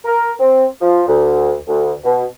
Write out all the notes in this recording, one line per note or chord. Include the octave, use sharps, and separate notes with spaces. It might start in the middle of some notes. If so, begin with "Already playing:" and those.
A#4
C4
F3
D2
D2
B2